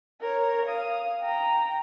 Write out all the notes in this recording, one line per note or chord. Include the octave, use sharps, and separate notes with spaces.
A#4 C#5
F5 D#6
G5 A#5